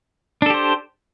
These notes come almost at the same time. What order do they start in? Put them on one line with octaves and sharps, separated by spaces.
D4 A4 G4 C5